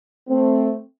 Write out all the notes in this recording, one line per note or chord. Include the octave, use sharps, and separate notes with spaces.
A3 C4